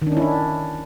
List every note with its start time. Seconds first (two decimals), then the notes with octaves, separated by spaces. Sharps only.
0.02 D#3
0.07 D4
0.12 C#4
0.17 E4
0.22 D4